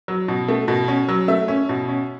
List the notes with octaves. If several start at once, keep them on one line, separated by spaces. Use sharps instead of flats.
F#3
B2
A3
B2
C#4
F#3
A3 E5
C#4
B2
C#4